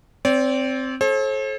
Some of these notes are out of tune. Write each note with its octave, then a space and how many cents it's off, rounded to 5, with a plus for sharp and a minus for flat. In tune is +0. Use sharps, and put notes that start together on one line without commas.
C4 +0 D5 -40
A4 -35 C5 +45